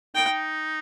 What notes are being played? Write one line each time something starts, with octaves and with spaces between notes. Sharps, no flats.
D#4 G5